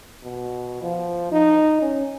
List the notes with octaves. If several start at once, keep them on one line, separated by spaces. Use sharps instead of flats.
B2
F3
D#4
C#4